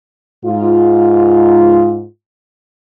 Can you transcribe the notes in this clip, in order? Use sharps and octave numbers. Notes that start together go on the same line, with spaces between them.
G#2 F4